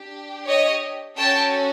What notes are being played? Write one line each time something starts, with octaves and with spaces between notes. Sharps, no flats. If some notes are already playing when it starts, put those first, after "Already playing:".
Already playing: D4 G4
C#5 D#5
C#4 F#4 A4 G5 A5